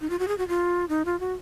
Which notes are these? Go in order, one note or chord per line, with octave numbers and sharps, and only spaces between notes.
D#4
F4
F#4
G#4
F#4
F4
D#4
F4
F#4